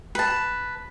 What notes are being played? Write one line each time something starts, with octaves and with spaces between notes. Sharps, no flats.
B4 A5